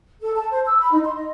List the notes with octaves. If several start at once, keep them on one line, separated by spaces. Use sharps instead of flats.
A4
A5
C5
E6
B5
D#4
C6
D#5